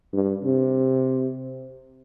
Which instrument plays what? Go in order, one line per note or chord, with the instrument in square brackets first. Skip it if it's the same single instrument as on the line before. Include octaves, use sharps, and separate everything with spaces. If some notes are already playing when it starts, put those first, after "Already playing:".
[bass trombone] G2
C3